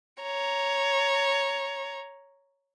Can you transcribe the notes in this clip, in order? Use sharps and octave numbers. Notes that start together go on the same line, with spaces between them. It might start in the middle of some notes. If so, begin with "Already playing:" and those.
C#5 A#5